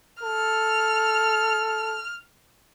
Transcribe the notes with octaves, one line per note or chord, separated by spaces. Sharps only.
A4 F6